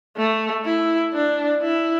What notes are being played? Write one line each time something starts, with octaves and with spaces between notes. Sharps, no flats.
A3
E4
D4
E4